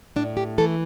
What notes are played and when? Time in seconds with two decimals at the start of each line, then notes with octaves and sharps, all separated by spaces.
0.16 A2 D4
0.37 G4
0.58 E3 A3 A4